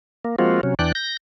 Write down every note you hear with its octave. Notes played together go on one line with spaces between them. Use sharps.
A#3
F3 G#3 A#3 C4 F4 F#4
C3 F#3 C#4
E2 E3 D4 D5 G5 F#6
G6 A#6